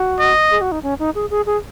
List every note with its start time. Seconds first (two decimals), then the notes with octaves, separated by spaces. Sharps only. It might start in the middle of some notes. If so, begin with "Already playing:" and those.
Already playing: F#4
0.20 D#5
0.51 G#4
0.61 F#4
0.72 D#4
0.83 C#4
0.99 D#4
1.15 G#4
1.30 G#4
1.46 G#4